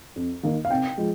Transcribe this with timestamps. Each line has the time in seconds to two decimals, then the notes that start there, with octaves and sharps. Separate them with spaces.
0.16 F2
0.43 D#3 A#3 D#4
0.65 F5
0.70 C3 G5
0.98 F3 G#3